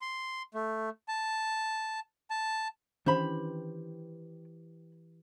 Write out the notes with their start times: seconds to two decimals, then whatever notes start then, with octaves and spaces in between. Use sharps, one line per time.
0.01 C6
0.54 A3
1.08 A5
2.30 A5
3.06 D#3 E3 C#4 D4 G4 C5 B5